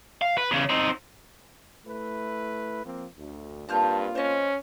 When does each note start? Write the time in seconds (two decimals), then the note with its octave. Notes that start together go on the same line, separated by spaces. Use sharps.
0.22 F5
0.38 B4
0.51 E2 C#3
0.69 C4 D#4
1.87 A3 E4 B4
2.85 F3 A#3 C4
3.18 D2
3.69 G2 A#3 C4 F4 A5 F6 G6
4.15 C#4 C5 D#5